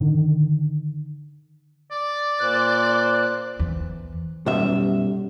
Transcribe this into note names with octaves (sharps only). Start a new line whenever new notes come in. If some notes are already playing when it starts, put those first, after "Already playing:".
D3 D#3
D5
A#2 C5 F#6
E2
B1 F#2 G3 E5